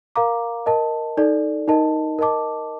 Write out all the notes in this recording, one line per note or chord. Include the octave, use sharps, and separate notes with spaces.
A#4 F5 A#5 D6
A#4 D#5 A5
D#4 A4 D5
D#4 A#4 D#5 A5
A#4 D#5 A5 D6